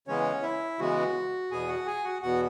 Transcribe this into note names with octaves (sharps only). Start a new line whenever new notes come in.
C#3 E3 G#3 B3 C#4 C#5
E4 E5
C#3 E3 G#3 B3 F#4
E2 B2 B3 G#4 G#5
F#4 F#5
G#4 G#5
F#4 F#5
E2 B2 B3 F#4 F#5